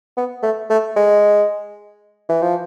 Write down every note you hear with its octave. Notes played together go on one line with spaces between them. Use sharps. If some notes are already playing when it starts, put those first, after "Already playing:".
B3
A3
A3
G#3
E3
F3